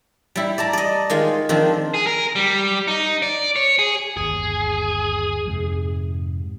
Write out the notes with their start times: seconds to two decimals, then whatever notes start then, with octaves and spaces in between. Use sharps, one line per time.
0.36 G3 E4
0.58 D5 A5 A#5
0.73 D5 D#5
1.10 D#3 G#3 F4
1.49 D#3 F3 C4 D4
1.94 G#4
2.07 A#4
2.35 G3
2.88 D#4
3.22 D5
3.56 C#5
3.79 G#4
4.17 G1 D#2 G#4
5.46 F2 G#2 C3